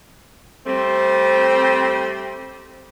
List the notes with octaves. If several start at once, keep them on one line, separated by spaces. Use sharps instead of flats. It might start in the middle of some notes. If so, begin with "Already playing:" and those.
G3 A3 C4